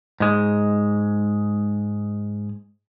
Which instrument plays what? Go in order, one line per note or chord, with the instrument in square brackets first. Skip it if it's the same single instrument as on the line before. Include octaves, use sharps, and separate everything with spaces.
[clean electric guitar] G#2 G#3